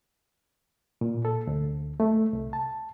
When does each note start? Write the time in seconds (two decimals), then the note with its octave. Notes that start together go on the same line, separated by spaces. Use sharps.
1.01 A#2
1.25 A4
1.47 D2
2.00 A3
2.33 C2
2.53 A5